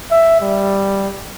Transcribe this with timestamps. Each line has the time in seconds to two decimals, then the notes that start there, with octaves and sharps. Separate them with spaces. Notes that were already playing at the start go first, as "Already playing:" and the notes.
0.11 E5
0.41 G3